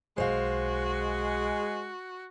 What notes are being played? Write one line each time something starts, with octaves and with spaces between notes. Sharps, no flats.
B1 G#3 F#4 C5 F5